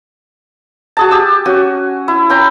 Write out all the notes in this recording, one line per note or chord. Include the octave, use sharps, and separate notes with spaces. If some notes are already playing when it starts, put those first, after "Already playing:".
F#4 G#4 A5
G4 E6
C#4 F#4 G#5
E4
C#4 G5 A#5